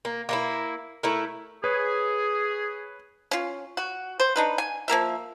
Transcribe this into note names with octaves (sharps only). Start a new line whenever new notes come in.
A#3
A#3 D#4 E4
A3 E4 A#4
G#4 B4 C#5
C#4 F4
F#4
C5
D4 D#4 B4
G#5
F3 A#3 A#4 E5